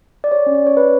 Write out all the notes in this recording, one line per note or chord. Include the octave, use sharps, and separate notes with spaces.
D5
G4 C#5
C#4
D5
C#4 C#5
C#4 B4